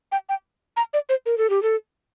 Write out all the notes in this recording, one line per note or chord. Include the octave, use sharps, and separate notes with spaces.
G5
G5
A#5
D5
C5
A#4
A4
G4
A4